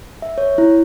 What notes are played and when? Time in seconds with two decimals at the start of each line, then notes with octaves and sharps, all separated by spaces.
0.22 E5
0.38 C#5
0.58 E4